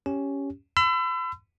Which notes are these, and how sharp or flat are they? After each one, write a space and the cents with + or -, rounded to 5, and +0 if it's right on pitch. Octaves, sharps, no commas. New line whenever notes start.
C#4 +5 G4 +0
B5 +45 E6 +30